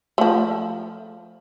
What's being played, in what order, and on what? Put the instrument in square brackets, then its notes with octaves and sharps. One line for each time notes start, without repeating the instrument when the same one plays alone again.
[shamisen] F3 A3